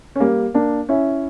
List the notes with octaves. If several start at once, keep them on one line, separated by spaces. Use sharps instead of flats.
C#4
G3 A#3
A#3 D4
C#4 E4